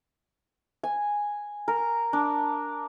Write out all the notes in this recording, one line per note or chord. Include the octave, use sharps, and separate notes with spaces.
G#5
A#4
D4